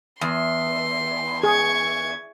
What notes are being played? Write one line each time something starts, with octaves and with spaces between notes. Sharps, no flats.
E2 C6
G#4 C#6 G#6